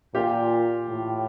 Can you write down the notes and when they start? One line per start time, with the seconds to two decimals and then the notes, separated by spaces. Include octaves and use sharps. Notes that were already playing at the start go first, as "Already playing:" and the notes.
0.14 A#2 F4 G4
0.89 A2